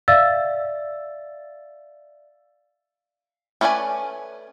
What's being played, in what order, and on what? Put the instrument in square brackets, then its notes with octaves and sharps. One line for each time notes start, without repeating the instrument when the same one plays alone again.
[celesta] D5 E5 F5 E6 A6
[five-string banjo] A3 C#4 B4 D5 G#5